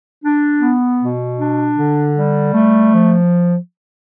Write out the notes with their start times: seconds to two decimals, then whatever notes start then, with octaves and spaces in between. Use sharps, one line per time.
0.23 D4
0.60 B3
0.99 B2
1.38 D4
1.77 D3
2.15 G3
2.53 A3
2.91 F3